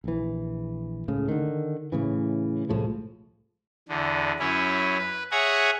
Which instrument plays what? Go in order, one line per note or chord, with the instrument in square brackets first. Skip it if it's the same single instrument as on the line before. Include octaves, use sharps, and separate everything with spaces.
[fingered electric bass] A#1 E3
C#2 A2 C#3
D3 D#3
A2 C#3 E3
C2 A2 F3 G#3
[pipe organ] E2 D3
F#2 C#4 E4
B4
G#4 C#5 E5 F#5 G#5 A#5